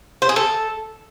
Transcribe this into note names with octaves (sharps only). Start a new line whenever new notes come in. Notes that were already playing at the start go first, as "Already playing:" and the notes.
C5
G#4
A4